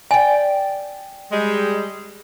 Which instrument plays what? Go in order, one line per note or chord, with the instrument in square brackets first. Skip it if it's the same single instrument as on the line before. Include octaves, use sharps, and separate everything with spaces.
[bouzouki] D5 G5 [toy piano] G#5
[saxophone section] G3 G#3